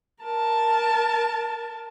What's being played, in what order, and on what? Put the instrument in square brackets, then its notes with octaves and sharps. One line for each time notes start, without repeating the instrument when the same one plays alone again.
[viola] A#4 A5